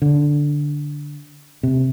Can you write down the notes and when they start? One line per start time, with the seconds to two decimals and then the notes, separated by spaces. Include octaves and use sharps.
0.02 D3
1.63 C3